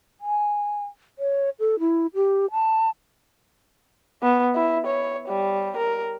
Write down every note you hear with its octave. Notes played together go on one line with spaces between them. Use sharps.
G#5
C#5
A4
E4
G4
A5
B3
E4
C#5
G3
A#4